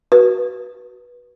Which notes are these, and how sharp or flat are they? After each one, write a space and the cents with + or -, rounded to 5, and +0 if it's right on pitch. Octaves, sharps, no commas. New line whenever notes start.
F#4 +15 B4 -20